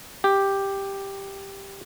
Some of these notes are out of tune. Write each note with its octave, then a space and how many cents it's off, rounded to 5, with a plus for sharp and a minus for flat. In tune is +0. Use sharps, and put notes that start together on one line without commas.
G4 +5